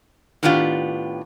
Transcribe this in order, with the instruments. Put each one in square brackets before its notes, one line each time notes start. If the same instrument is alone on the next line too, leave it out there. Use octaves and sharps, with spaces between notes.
[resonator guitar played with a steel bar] A2 D#3 B3 D4 F4 G4